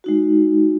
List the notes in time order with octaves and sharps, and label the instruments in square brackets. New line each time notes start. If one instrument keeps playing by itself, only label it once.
[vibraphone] G#3 D#4 F#4